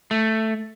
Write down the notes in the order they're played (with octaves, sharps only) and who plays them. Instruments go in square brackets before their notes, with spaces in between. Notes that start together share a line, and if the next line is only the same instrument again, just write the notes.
[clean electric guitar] A3